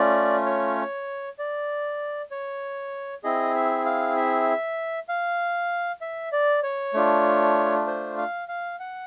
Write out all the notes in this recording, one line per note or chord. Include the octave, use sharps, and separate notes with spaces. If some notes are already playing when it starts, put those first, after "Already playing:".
Already playing: A3 C#4 F4 D5
C#5
D5
C#5
C4 E4 G#4 D#5
E5
F5
E5
F5
E5
D5
C#5
A3 D4 F4
C5
F5
F5
F#5